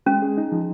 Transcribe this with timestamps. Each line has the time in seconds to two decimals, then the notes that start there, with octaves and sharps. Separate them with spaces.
0.06 G#3 C#4
0.22 G#4
0.38 D#4
0.52 F3